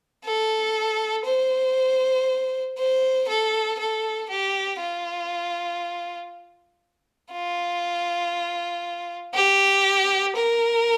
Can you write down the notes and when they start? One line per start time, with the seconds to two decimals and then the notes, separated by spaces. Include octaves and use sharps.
0.25 A4
1.26 C5
2.78 C5
3.28 A4
3.79 A4
4.30 G4
4.81 F4
7.33 F4
9.34 G4
10.36 A#4